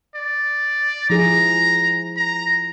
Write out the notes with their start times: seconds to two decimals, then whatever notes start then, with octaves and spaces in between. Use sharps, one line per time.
0.15 D5
1.10 F3 E4 G#4 A#5
2.17 A#5